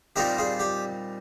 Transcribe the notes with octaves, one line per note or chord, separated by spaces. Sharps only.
A#2 G3 C4 D#4 G4 A#4
F4 G#4
G4